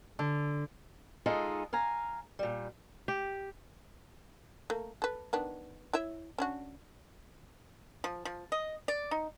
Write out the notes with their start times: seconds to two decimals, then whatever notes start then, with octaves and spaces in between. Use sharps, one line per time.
0.19 D3
1.26 G#3 D#4 F4 G#4 A4
1.73 F5 G#5 A#5
2.39 A#2 G3
3.08 G4
4.70 A3 A#3
5.02 A4 B4
5.33 D#3 B3 D4
5.93 E4 C#5 E5
6.38 C#4 D4 F#4
8.04 F3
8.25 F3
8.52 D#5
8.88 D5
9.11 D#4